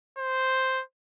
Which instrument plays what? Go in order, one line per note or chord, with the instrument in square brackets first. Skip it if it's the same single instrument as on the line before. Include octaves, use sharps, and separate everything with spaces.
[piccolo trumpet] C5